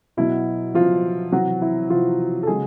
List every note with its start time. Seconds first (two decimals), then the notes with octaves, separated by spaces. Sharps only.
0.17 B2 F#3 E4
0.74 B2 F3 F#3 F4
1.32 C3 E3 F#3 F#4
1.62 E4
1.90 C3 E3 F3 F4
2.43 A4
2.47 C#3 F#3 G#3 G#4